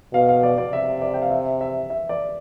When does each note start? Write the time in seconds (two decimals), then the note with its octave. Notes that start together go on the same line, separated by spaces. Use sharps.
0.13 B2 F5
0.29 F5
0.43 D5
0.58 D5
0.72 C3 E5
1.02 D5
1.14 G5
1.22 F5
1.31 E5
1.61 E5
1.90 E5
2.09 D5